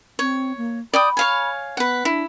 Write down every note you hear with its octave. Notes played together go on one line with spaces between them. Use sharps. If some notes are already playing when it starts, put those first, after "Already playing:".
C4 C#5
A#3
D5 G5 B5 D#6
C#5 F5 G#5
B3 B4 F#5
D4 E4